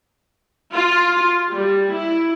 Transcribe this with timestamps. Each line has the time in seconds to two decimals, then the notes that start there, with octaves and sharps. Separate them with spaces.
0.73 F4
1.51 G3
1.92 E4